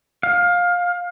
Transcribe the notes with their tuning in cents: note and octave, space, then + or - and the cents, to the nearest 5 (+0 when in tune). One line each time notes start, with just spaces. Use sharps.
F5 +20